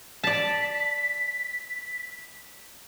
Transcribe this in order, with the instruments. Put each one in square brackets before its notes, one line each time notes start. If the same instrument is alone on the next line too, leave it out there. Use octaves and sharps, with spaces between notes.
[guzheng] D5 A5 [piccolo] B6